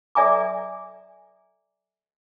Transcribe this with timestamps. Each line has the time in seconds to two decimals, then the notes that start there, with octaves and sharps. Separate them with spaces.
0.15 A4 D5 E5 G#5 A#5 D6